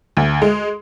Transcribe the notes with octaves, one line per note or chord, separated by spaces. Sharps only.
D2
G#3